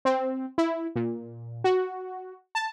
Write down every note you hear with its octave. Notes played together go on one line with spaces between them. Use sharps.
C4
E4
A#2
F#4
A5